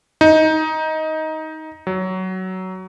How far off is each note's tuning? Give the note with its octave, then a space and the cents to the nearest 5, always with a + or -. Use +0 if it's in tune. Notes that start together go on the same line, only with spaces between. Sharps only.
D#4 +15
F#3 +15